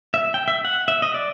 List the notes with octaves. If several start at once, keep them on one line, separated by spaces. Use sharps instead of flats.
E5
G5
E5
F#5
E5
D#5
D5